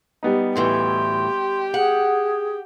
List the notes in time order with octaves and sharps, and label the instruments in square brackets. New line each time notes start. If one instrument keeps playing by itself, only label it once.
[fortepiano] G3 B3 D#4
[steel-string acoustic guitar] D2 A2 E3 [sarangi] G4 [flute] C6
[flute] G#4 [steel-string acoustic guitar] F#5